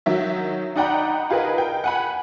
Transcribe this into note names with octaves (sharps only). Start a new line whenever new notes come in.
D#3 F#3 E5
D#4 D5 F#5 G5 A#5 B5
F4 G#4 A#4 B4 D#5
G5
F#5 G#5 B5